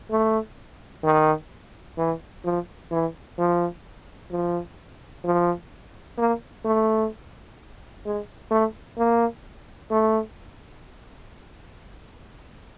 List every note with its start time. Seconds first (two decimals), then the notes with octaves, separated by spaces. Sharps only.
0.10 A3
1.04 D#3
1.98 E3
2.45 F3
2.91 E3
3.38 F3
4.31 F3
5.24 F3
6.18 A#3
6.65 A3
8.05 G#3
8.51 A3
8.98 A#3
9.91 A3